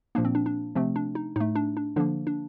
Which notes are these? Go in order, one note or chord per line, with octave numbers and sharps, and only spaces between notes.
A#2 F3 A#3 D4
C4
D4
D4
C3 F3 A3 C4
D4
D#4
A2 A3 D#4
D4
D4
D3 F3 A#3 D4
D4